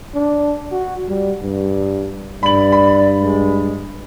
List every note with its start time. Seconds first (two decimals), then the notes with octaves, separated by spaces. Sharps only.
0.14 D4
0.72 F#4
1.08 G3
1.43 G2
2.43 G2 D5 B5 F#7
2.72 B5
3.20 G#3